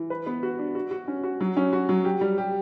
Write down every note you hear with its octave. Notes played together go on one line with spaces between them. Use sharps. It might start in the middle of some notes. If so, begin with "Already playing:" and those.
Already playing: E3
B4
B3
F#4
D4
F#4
F#4
C#4
F#4
F#3
C#4
F#4
F#3
G4
G3
G4